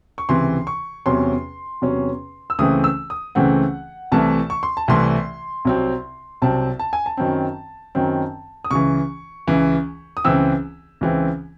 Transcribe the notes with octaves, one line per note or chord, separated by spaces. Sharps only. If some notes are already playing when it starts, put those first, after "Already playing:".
C#6
C#2 C3 E3 C6
C#6
E2 C3 F#3 C#4 C6
E2 C3 F#3 C#4
E6
C#2 C#3 E3 A3 C4 D#6
E6
D#6
C#2 C#3 E3 A3 C4 F#5
C2 C3 E3 A3 A5
C#6
C6
A5
C2 C3 E3 A3 C6
C2 C3 F#3 C4
C2 C3 F#3 C4 A5
A5
G#5
A5
F#2 D#3 F#3 C4
F#2 D#3 F#3 C4
D#6
C#2 C#3 E3 C#6
C#2 C#3 E3
D#6
C#2 C#3 E3 C4 E6
C#2 C#3 E3 C4